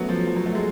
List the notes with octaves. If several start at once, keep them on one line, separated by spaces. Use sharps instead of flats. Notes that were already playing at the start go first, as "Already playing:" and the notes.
Already playing: F#3 A3 B3 C#4
F3
F3
F#3
A3
G#3